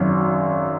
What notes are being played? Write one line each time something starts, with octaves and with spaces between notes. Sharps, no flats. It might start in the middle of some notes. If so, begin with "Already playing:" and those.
Already playing: G#1 F#2 F#3 C#4